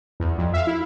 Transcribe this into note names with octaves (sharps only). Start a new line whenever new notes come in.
E2
F2
E5 F5
E4